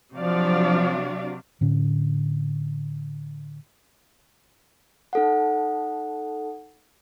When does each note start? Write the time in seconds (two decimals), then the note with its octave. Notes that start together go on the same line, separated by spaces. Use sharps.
0.15 C3 F3 F#3 D4 F#4 D5 F5
1.61 A2 D3 C#4
5.13 D#4 A4 F#5